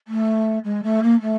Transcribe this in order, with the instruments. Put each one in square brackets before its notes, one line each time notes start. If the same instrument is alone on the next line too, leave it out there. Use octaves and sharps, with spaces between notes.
[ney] A3
G#3
A3
A#3
A3